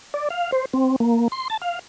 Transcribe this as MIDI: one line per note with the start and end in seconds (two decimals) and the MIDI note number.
0.14 0.29 74
0.30 0.51 77
0.52 0.65 72
0.73 0.96 60
1.00 1.28 58
1.32 1.48 84
1.50 1.57 81
1.62 1.79 77